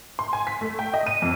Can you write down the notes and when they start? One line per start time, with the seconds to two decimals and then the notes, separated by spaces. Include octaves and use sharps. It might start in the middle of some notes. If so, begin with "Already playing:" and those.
0.19 C6
0.33 G#5
0.47 B6
0.61 A3
0.79 G5
0.94 D#5
1.07 D#7
1.22 F2